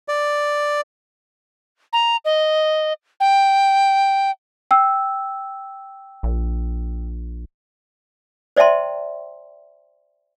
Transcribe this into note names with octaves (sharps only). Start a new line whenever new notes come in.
D5
A#5
D#5
G5
G5 E6
A#1
C5 D5 E5 G5 A5 C6